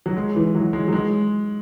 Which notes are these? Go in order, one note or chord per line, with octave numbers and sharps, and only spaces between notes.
F#3
G#3
E3
F#3
G#3
F#3
G#3